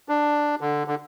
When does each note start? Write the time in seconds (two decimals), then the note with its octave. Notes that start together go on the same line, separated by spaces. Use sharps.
0.09 D4
0.61 D3
0.87 D3